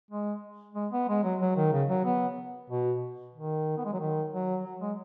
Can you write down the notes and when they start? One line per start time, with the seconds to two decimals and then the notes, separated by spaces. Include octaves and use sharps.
0.11 G#3
0.75 G#3
0.92 B3
1.09 G#3
1.24 F#3
1.41 F#3
1.57 D#3
1.72 C#3
1.89 F#3
2.05 B3
2.70 B2
3.36 D#3
3.78 B3
3.85 G#3
3.93 F#3
4.00 D#3
4.33 F#3
4.65 F#3
4.81 G#3